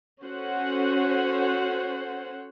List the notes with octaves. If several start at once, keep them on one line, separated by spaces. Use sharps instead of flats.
C#4 F#4 A4 C5 C#5 F#5